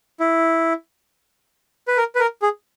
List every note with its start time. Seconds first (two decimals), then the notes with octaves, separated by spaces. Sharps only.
0.20 E4
1.88 B4
1.97 A#4
2.15 B4
2.20 A#4
2.42 G#4